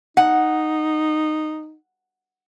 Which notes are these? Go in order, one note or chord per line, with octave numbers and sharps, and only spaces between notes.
D#4 F#5